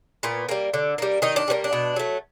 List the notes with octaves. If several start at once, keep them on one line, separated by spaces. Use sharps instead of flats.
A#2 B3
G3 A#3
D3
G3 A#3
D#3 D#4
D4
G3 A#3 C#4
D4
B2
F#3 A3